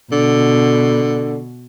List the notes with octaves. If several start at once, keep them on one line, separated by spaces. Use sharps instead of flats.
B2 D3